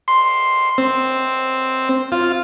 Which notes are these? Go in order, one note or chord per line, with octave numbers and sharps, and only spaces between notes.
C6
C4
F4